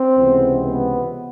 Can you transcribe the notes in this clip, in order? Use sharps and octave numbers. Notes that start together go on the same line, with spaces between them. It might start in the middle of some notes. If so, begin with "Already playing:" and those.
Already playing: C4
C#2 C3 E3 G#3 B3
B3